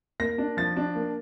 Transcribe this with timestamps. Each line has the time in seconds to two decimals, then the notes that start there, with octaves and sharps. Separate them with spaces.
0.20 A#3 A#6
0.38 D4
0.57 F3 A6
0.76 D4
0.95 A#3